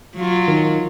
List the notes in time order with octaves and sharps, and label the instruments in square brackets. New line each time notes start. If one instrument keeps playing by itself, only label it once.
[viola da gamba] F#3 F4
[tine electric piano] D#3